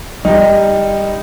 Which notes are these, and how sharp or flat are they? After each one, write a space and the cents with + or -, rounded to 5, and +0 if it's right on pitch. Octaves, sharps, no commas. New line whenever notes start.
G3 +15 D#4 +0